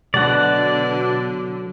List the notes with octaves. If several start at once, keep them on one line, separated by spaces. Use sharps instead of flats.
B2 D3 F#3 D5 F#5